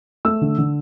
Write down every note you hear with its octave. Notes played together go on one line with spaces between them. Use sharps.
A3 E6
D3
D3